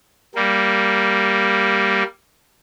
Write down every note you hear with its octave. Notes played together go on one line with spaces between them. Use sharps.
G3 A#3